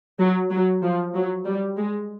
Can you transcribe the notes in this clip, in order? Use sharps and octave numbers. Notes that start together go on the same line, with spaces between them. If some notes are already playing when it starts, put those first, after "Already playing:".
F#3
F#3
F3
F#3
G3
G#3